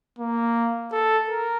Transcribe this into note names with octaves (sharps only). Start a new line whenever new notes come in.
A#3
A4
A#4